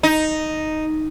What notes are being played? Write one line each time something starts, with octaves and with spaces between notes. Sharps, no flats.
D#4